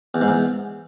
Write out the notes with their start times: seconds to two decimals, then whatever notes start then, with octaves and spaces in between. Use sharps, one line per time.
0.14 E2
0.21 G#2
0.28 E2